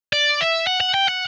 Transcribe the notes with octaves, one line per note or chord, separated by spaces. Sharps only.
D5
E5
F#5
F#5
G5
F#5